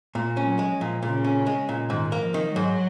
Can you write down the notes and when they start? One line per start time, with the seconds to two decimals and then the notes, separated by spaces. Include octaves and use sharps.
0.15 A#2 A#3
0.37 C#4
0.44 F#3
0.59 G#3
0.74 F3
0.81 A#2
1.03 A#2 C#3
1.24 C#4
1.47 G#3
1.69 A#2
1.90 G#2 D#3
2.12 A#3
2.19 F3
2.34 D#3
2.48 F#3
2.56 G#2